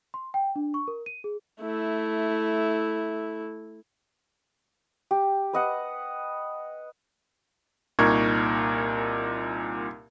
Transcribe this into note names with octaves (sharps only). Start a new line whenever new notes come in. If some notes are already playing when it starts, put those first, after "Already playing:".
C6
G5
D4
C#6
A#4
D#7
G#4
A3 E4
G4
B4 D#5 F#5
C2 A#2 D#4 A#4 C#6 G#6